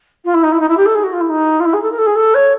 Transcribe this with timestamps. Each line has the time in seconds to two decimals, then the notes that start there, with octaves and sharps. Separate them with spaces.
0.24 F4
0.34 E4
0.43 D#4
0.51 E4
0.59 D#4
0.68 E4
0.77 G4
0.85 A4
0.95 G#4
1.03 F#4
1.12 F4
1.20 E4
1.29 D#4
1.60 F4
1.64 E4
1.73 G#4
1.82 A4
1.91 A#4
1.98 A4
2.06 G#4
2.15 A4
2.34 C#5